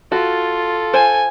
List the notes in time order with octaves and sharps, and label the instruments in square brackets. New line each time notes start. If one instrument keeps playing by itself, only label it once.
[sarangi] F4 [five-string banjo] F#4 [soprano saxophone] A4
[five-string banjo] C5 [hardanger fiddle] G#5